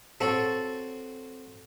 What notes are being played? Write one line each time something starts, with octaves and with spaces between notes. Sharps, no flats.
C4 F#4 A4 C#5